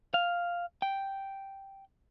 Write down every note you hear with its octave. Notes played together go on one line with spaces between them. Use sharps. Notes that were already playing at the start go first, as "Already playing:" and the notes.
F5
G5